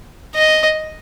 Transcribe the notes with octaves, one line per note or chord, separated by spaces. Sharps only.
D#5